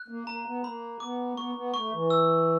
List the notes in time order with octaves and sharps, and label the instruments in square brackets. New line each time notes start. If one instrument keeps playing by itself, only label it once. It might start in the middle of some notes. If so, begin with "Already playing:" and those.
Already playing: [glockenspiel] F#6
[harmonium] A#3
[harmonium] A#3 [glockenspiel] A#5
[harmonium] B3
[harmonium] A#3 [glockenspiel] B5
[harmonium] B3 [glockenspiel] D6
[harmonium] A#3
[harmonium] B3 [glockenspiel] C#6
[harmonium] B3
[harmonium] A3 [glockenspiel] C#6
[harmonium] E3
[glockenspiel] E6